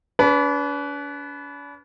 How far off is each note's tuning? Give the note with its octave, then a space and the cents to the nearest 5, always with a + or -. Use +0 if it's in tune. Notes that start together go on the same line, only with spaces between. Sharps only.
D4 -45 B4 +0